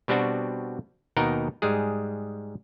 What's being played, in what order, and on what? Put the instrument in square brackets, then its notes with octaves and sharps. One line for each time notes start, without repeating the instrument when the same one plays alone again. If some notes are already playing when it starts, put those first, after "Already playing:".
[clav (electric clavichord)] B2 G3 B3 C4 D4 F#4
D#2 B2 D#4 A#4 F#5 G5
G#2 G3 G#3 G#4